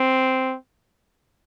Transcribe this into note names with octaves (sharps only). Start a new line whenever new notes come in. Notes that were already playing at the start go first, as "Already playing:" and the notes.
Already playing: C4